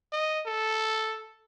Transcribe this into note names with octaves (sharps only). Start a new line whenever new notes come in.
D#5
A4